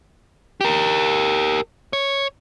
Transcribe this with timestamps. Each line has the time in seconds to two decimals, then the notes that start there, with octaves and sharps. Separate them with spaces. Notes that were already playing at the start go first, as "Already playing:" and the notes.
0.61 G4 A#4
1.93 C#5